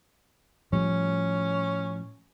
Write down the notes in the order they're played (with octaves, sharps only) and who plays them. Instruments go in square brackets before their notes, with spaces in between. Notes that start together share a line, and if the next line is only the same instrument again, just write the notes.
[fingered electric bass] A2 F3 G3 [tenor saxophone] C#4